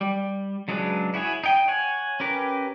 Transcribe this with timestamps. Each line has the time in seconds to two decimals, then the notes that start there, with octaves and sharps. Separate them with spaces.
0.01 G3
0.68 C#3 F#3 G#3 D4 B4
1.14 E4 F#4 G#4 C#5
1.44 D#4 G5
1.68 C#5 F#5 G#5
2.20 C#4 G4 A#4 B4